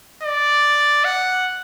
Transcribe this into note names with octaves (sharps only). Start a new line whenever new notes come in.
D5
F#5